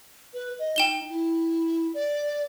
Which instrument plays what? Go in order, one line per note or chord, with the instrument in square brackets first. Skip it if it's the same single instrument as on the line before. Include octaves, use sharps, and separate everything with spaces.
[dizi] B4
D#5
[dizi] D#4 [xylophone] G5 E7 G7
[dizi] E4
D5